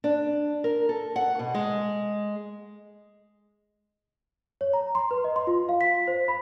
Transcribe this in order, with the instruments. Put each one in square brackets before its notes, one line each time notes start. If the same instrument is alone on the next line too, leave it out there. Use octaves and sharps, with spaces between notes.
[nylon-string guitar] D4
A#4
A4
F#5
B2
G#3
[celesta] C#5
A#5
C6
B4
D#5
C6
F4
F5
B6
C5
B5